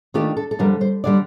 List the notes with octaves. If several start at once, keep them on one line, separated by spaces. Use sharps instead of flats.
D#3 A3 D4 F4 G4
A4
A4
F2 D3 G3 A#4
C5
D3 G3 D5